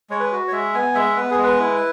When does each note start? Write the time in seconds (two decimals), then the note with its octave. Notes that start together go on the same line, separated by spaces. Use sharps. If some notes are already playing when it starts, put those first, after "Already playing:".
0.10 G#3 C#5
0.20 B4
0.32 F#4
0.48 C#5
0.52 G#3 E5
0.74 B3 G#5
0.95 G#3 E5
1.16 B3 B4
1.31 G#4
1.38 G#3
1.44 B4
1.60 E4